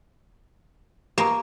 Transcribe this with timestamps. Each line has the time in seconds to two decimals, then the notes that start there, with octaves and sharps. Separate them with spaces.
1.18 A#3 G4 A5 A#5